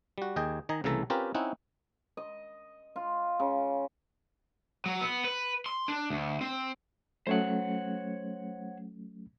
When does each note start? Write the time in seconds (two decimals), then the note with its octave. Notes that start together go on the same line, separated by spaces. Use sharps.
0.18 G3 F#4
0.36 D#2 G#4 D#5 G5
0.69 D#3 D#5 G#5 A#5
0.84 C2 C#3 E3 A3 A4 A#5
1.10 C4 C#4 F4 G4 A#4 B4
1.34 C4 C#4 D#4 E4 F#5
2.17 D#5
2.96 F4
3.39 C#3
4.86 F#3
5.01 B3
5.25 B4
5.66 C6
5.88 D4
6.10 D2
6.41 C4
7.27 F#3 A3 C#4 C5 C#5 F#5